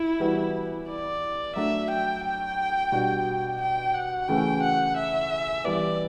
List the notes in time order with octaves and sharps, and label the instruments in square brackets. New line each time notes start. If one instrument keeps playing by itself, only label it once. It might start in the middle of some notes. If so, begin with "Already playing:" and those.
Already playing: [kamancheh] E4
[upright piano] E3 G3 B3 F#4
[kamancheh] D5
[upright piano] F#3 A3 D4 [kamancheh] E5
[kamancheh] G5
G5
[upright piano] B2 G3 D4 F#4
[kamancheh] G5
F#5
[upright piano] C#3 E3 A3 C#4 F#4 [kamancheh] G5
[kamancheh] F#5
E5
[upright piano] E3 G3 B3 [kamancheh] D5